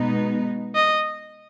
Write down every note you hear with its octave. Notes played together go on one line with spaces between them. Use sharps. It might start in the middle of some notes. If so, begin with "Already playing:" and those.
Already playing: B2 G#3 B3 D#4
D#5